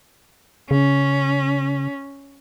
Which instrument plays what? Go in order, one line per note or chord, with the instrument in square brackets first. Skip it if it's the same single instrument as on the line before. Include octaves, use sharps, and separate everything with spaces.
[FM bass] C#3 [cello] C#4